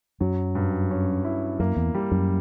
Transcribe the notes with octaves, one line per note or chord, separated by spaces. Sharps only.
F#2 F#3
G2
C#4
E4
F#2 A#3
E2
G3
F#2